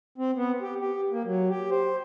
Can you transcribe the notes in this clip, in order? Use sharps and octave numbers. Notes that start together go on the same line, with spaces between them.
C4
B3
G4
G4
A#3
F#3
G4
C5